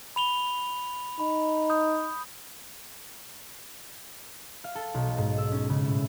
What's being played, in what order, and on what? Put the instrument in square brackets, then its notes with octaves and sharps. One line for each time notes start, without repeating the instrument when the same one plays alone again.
[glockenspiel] B5 F7 G7
[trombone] D#4 [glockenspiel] B5
[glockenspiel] D#6 G6
[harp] F5
A4
B1
G#2
E6
C#4
C#3
A2